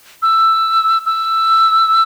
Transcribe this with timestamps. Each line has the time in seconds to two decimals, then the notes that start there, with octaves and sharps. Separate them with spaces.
0.22 E6
1.06 E6